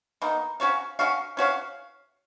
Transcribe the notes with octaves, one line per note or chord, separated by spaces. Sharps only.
B2 A#3 D#4
C#4 F#4 C#5 F5
C#4 F#4 C#5 F5
C#4 F#4 C#5 F5